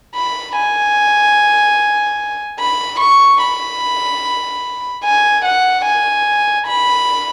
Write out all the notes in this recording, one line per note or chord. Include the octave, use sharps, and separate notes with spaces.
B5
G#5
B5
C#6
B5
G#5
F#5
G#5
B5